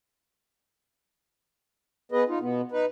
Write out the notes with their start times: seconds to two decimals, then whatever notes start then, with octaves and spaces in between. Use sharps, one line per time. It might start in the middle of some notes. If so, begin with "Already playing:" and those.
2.12 B3 G#4 B4 D#5
2.28 D#4 F4
2.41 B2 B3
2.72 D#4 B4